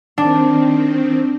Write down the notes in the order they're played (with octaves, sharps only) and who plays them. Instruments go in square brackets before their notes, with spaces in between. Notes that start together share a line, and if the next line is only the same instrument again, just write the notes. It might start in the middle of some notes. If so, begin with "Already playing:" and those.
[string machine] D#3 C4 [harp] D4